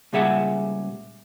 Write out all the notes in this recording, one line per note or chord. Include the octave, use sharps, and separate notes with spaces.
C#2 A#2 G3 G#4 E5 F#5